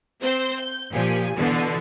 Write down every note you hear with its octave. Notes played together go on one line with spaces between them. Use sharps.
C4 C5 G6
G6
A#2 F3 G4 G#5
B2 D3 E3